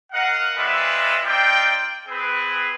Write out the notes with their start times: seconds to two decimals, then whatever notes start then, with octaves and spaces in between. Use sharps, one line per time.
0.13 A#4 D#5 F5 F#5
0.56 G#3 C4 F4 B4 D5 E5
1.25 C4 D#4 F4 D5 G5
2.08 C4 G#4 B4